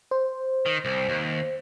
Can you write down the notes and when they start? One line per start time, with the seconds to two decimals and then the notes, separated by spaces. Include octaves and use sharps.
0.11 C5
0.66 D#3
0.85 C2
1.09 D#2